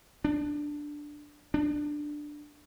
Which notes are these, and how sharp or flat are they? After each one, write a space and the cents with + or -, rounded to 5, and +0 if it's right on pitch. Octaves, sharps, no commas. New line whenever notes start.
D4 +5
D4 +10